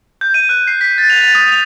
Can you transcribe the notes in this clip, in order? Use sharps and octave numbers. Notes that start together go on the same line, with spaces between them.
G6
D#7
F#6
C7
B6
A6
F7
A6
D#6
F7